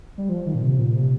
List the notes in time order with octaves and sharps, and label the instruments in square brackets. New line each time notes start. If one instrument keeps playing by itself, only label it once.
[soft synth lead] G3
F3
D#3
A#2
C3
A#2
C3